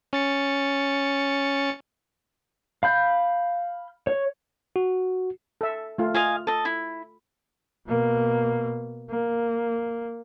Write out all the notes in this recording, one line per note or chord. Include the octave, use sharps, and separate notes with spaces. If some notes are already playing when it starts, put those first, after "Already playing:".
C#4 A6 C#7
F5 B5 G6
C#5
F#4
A4 E5
A3 F4
F4 D#5 F5 G#5
A4 D#5 A5
E4
B2 A#3
A#3